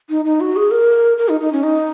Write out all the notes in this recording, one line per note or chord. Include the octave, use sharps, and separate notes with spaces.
D#4
D#4
F#4
G#4
A#4
A#4
D#4
D#4
C#4
D#4